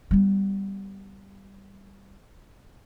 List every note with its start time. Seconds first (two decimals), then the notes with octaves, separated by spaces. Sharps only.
0.11 G3 B3